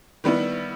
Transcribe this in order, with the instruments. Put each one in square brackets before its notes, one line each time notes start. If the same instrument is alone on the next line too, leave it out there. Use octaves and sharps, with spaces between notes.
[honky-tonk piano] D#3 G3 B3 E4